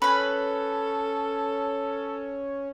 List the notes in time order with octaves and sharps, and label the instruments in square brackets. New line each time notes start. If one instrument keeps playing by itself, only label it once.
[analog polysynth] C#4 [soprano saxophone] A4 [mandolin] B4 B5